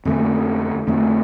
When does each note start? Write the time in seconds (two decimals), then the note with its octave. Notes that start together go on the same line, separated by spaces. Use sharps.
0.05 F2 D3 A3
0.87 F2 D3 A3